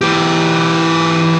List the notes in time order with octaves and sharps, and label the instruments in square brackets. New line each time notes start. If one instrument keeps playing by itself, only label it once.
[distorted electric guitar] E3 G4